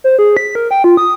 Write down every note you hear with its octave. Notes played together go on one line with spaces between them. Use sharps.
C5
G#4
B6
A#4
G5
F4
D#6